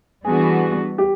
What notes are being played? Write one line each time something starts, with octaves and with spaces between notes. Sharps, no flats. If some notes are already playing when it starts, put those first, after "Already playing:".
E3 G3 B3 D4 F#4 G#4
G4